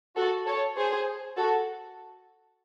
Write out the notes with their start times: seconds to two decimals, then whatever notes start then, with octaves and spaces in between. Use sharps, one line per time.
0.16 F#4 A4
0.46 A4 C#5
0.77 G#4 C5
1.37 F#4 A4